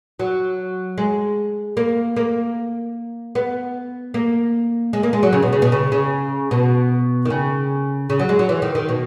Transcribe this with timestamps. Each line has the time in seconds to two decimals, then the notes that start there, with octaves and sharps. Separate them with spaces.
0.19 F#3
0.98 G#3
1.77 A#3
2.16 A#3
3.35 B3
4.14 A#3
4.93 G#3
5.03 A#3
5.13 G#3
5.23 F#3
5.33 C#3
5.43 B2
5.53 C#3
5.62 B2
5.72 C#3
5.92 C#3
6.51 B2
7.25 D#3
7.30 C#3
8.10 C#3
8.19 F#3
8.29 G#3
8.39 F#3
8.49 E3
8.62 D#3
8.75 D#3
8.89 B2